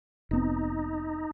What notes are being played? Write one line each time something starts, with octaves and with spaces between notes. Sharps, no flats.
F1 B3 C4 D#4